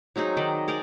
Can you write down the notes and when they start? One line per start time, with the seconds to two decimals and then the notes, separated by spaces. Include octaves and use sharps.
0.16 F#3 C4 D#4 G#4
0.37 D#3 D5 D#5
0.68 G#4 A#4 C5 D5